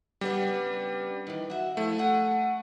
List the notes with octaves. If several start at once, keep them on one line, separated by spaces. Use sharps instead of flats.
C#3 G3 B3 D4
D#3 E3
F#4 E5
F3 A3 E4 F5
F#5 G#5